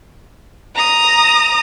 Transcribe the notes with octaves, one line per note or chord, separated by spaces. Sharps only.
A#5 D#6